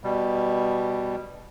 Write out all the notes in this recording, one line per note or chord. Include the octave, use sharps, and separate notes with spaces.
B2 G3